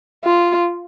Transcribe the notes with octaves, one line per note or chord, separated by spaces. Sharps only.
F4